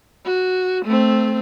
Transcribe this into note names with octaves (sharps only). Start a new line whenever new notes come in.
F#4
A3 C4